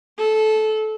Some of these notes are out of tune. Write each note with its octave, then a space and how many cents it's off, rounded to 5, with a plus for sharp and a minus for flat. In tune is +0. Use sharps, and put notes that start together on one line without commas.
A4 -20